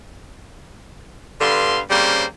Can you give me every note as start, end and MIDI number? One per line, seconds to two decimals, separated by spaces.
1.40 1.80 43
1.40 1.80 50
1.40 1.80 59
1.40 1.80 77
1.40 1.80 84
1.90 2.24 49
1.90 2.24 55
1.90 2.24 58
1.90 2.24 60
1.90 2.24 61
1.90 2.24 72